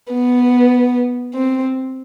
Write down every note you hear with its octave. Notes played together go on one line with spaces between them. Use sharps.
B3
C4